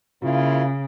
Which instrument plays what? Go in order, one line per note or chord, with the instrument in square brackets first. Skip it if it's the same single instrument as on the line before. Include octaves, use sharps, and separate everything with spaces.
[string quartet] C#3 [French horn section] A#3 E4 F4